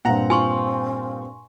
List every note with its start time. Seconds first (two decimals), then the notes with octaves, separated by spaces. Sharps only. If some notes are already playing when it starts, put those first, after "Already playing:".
0.05 G2 A#2 C4 F#5 A#5
0.30 F4 G#5 C6 C#6